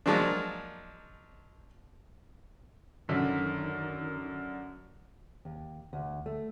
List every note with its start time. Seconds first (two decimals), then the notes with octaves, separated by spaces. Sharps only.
0.06 F3 F#3 G#3 A#3 D4
3.09 F#2 D3 D#3 B6
5.45 D#2
5.93 D2
6.26 A3